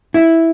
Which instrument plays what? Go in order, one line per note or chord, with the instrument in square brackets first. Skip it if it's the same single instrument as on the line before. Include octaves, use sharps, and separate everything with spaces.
[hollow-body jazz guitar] E4